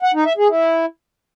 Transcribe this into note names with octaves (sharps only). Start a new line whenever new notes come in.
F#5
D#4
E5
G#4
E4